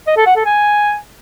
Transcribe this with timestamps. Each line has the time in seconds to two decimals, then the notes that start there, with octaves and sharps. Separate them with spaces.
0.07 D#5
0.17 A4
0.26 F#5
0.36 A4
0.46 G#5